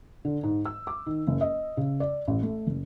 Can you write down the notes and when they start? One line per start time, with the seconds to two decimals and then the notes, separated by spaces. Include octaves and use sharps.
0.25 D3
0.43 G#2
0.65 E6
0.87 D6
1.06 D#3
1.27 F#1
1.41 D#5
1.77 C#3
2.00 D5
2.27 A1
2.43 A3
2.67 F#1